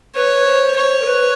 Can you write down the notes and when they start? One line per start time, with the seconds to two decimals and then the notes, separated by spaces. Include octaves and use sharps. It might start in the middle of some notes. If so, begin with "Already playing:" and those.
0.15 B4 C#5
0.46 C5
0.77 C#5
1.02 A#4
1.06 B4